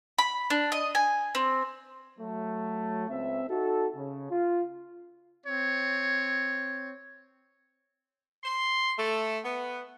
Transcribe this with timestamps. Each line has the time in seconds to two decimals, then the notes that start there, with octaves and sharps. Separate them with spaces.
0.18 B5
0.50 D4
0.72 D#5
0.95 G#5
1.35 C4
2.19 F#3 A3
3.09 C#2 C4 E5
3.49 D#4 F#4 A4
3.96 C#3
4.31 F4
5.46 C4 C#5
8.43 C6
8.97 A3
9.45 B3